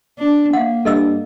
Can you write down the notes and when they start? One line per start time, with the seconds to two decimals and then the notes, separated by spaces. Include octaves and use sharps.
0.19 D4
0.53 A#3 F5 F#5
0.85 G2 A4 D#5 E6